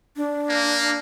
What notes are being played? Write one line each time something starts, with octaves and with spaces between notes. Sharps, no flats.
D4
A#3